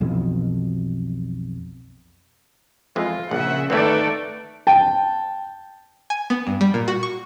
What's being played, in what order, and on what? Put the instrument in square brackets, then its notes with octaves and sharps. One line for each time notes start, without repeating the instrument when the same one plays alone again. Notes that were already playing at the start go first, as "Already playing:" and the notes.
[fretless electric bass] B1 F2 B2 E3
[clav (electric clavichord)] F2 E3 G#3 [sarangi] F4
[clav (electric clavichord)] A#1 [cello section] C#3 E5 [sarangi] F#5
[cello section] D#3 A4 D5 [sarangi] A3 [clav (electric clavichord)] C4 E4 [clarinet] B4
[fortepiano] G5 A5
[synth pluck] G#5
B3
G2
G3
A#2
F#4
C#6